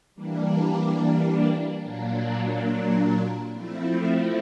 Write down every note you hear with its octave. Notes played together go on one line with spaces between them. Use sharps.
E3 G3 A#3 D4
A#2 F#3 A#3 D4
F3 A3 C4 E4